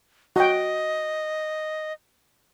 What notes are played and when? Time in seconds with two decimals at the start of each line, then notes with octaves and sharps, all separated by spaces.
0.36 F#4 D#5 G5